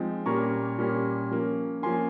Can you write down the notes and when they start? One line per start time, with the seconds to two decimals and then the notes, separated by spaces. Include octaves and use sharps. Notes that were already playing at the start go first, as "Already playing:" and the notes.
Already playing: F3 G#3 C4 D#4
0.26 A#2 G3 A#3 C#4 A#5 C#6
0.79 A#2 G3 A#3 C#4
1.31 F3 A#3 C#4
1.82 F3 A#3 C#4 G#5 C6